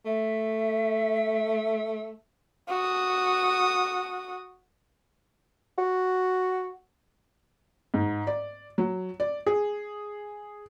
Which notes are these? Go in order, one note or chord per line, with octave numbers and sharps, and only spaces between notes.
A3 E5
F#4 D#6
F#4
G#2
D5
F#3
D5
G#4